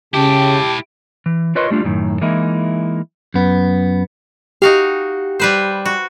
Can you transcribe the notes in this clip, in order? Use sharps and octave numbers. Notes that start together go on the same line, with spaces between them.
C#3 E4 G4 G5 A5
E3
F4 A#4 B4 C#5 D#5 C6
G3 A3 D4 F4
F#2 A2 D#3
E3 G#3 A#3 D#4 E4
F#2 B3
D#4 F#4 G4 F5
G3 B4 C5
F#4